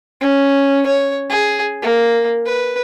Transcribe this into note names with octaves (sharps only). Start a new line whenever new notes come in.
C#4
C#5
G#4
A#3
B4